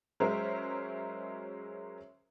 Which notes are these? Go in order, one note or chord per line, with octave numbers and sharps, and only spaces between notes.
F#3 G#3 C#4 A#4 C5 E5